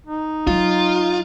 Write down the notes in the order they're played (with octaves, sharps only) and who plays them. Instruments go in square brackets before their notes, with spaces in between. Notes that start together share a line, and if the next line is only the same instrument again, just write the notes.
[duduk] D#4
[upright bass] F#3 [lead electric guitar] F4